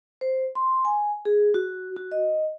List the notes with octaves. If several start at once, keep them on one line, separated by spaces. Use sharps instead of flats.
C5
C6
G#5
G#4
F#4
F#4
D#5